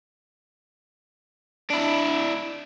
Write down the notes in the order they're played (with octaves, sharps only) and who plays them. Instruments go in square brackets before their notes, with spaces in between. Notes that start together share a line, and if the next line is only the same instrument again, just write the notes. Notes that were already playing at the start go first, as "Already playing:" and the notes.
[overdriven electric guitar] D4 E4